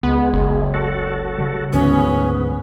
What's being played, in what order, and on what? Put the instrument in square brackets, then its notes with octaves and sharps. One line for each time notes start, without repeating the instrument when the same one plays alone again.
[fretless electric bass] C#2 [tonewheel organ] G#3 [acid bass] B3
[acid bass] F#1
[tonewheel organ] F#4 A4
[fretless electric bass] C#3 G3
[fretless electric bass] D2 E3 [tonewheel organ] G#2 B3 [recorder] C#4